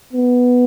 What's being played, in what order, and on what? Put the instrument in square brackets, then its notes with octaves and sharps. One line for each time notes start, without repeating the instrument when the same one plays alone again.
[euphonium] B3